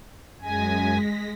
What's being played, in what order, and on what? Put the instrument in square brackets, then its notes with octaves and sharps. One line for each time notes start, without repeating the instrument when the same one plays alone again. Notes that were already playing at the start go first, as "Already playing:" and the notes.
[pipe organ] F#2 G#5 [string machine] G#3 A#6 B6